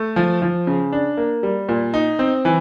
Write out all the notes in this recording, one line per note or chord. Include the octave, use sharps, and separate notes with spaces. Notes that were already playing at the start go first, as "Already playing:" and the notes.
Already playing: A3
F3
F3
C#3
D4
A#3
G3
A#2
D#4
C4
E3